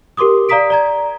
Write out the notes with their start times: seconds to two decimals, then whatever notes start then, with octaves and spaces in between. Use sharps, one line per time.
0.17 G4 A#4 C6 D6 D#6
0.49 D5 F5 A#5 D#6 B6 D7
0.70 D5 A#5 G#6